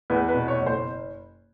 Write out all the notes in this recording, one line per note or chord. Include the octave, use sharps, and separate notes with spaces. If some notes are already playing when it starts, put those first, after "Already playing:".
E2 B4
B4
B2
C#5
F#1
C5